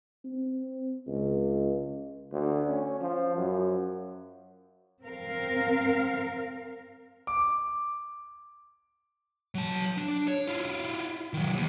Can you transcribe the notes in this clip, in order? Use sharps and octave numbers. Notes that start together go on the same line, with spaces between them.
C4
C#2
D2
C#4
F3
F#2
C4 A#4 F5
D6
F#3 A5
D4
C#5
E4 F4
D#3 F#3
D#2